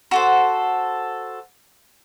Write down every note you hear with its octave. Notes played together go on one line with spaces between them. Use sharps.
F#4 A4 C5